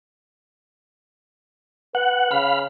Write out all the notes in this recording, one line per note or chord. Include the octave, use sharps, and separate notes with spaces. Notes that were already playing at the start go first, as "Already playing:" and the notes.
B4 F#5
C#3 F5 B5